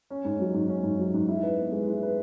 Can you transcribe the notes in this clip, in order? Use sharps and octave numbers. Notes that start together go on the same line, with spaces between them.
C#4
G#2
F#3
G#2
C#4
G#2
F#3
G#2
E4
B4
B3
G#3
E4
B4